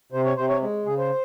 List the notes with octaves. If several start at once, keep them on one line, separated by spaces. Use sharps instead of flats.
C3 C5
C#5
C3 C5
C#5
G#3
C#3 G#4
C5